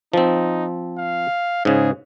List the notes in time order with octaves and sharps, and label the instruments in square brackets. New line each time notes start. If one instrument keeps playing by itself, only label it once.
[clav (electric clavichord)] F3 C4 [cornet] D#4
[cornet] F5
[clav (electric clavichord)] G#2 C#3 [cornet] G#4